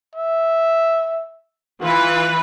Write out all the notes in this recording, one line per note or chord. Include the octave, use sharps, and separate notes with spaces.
E5
E3 F4 B4